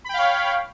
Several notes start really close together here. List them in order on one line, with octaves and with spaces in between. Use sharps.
B5 G5 F5 C#5